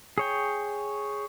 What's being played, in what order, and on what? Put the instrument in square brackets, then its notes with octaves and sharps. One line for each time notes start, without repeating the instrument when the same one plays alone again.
[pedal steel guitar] G#4 C#5 G5